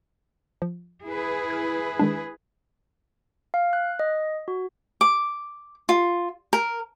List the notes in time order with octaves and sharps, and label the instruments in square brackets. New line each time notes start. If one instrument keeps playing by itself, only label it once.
[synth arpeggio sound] F3
[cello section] E4 G#4 B4
[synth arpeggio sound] F6 G#6
D#3 G#3 D4
[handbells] F5
F#6
D#5
F#4
[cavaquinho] D6
F4
A#4